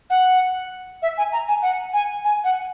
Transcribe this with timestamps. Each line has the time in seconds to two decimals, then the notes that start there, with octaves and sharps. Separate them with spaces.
0.09 F#5
1.02 E5
1.17 G#5
1.32 A#5
1.48 G#5
1.62 F#5
1.93 G#5
2.24 G#5
2.44 F#5